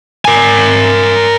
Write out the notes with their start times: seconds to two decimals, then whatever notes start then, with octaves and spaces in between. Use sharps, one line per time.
0.25 A#4 G#5